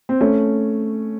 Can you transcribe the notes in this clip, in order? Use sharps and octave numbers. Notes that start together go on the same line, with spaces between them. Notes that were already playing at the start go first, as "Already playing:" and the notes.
C4
A3 C#4